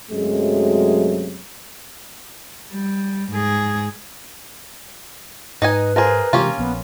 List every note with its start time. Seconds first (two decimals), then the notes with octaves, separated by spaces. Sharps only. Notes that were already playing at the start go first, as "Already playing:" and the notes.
0.11 F#2 C3 F#3 G#3 A3
2.72 G3
3.31 G#2 G#4
5.62 G#2 D#4 B4 D#5 G#5
5.96 F4 G#4 A#4 C5 G#5
6.33 C3 E3 G#3 A#3 C#4 F4 G4
6.58 A#1 F3 B3